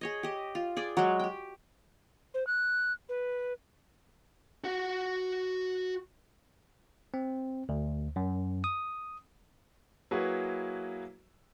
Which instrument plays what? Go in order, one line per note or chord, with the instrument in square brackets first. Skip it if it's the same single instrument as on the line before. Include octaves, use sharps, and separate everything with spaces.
[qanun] G#4 C#5 D#5
G4 D#5
F4
G#4 D5 G5
F#3 G#3
G4 G5
[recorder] C5
F#6
B4
[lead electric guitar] F#4 F#5
[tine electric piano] C4
D2
F#2
D#6
[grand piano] F#3 A#3 E4 F#4 G#4 B4